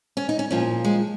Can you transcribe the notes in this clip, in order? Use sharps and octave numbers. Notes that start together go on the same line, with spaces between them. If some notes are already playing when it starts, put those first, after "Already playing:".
C#4
D#4
C#4
A#2 F3 C#4
G#3